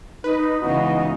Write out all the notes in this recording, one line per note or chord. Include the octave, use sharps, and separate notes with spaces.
D#4 B4
C#3 E3 G#3 B3 D#4 F#4 D#5